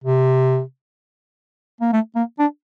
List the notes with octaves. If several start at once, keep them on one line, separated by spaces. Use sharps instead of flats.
C3
A#3
A3
A#3
D4